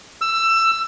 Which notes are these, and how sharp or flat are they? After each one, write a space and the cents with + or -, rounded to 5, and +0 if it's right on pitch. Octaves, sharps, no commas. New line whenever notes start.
E6 +20